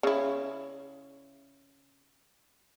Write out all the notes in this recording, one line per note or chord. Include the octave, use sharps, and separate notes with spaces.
C#3 E4